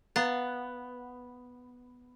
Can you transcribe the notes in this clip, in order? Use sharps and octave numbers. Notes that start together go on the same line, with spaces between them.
B3 F5 A#5 A6